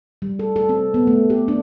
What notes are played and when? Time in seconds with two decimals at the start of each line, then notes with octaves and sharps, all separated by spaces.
0.22 G3
0.39 A4
0.56 A4
0.69 C4
0.94 B3
1.07 A3
1.30 G4
1.48 D4